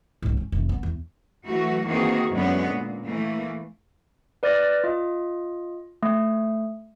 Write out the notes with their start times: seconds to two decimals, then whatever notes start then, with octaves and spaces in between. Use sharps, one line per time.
0.22 C#2 G#2
0.37 C#4
0.52 F1 D#3
0.69 B3
0.83 E2
1.46 E3 F#3 A3 F#4
1.86 D#3 E3 A#3 C4 F#4 G#4
2.32 F#2 D3 G#3 B3 C#4
2.72 A#2
3.05 E3 A3 A#3
4.43 B4 D5 F6 A6 A#6
4.84 F4 D#5
6.03 A3